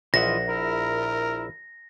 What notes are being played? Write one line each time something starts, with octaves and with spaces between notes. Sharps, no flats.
A#1 E3 F4 D#5 E5 F#5 A#6
E4 A#4